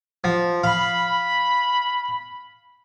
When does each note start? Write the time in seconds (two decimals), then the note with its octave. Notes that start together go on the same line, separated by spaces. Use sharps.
0.24 F3
0.63 F5 B5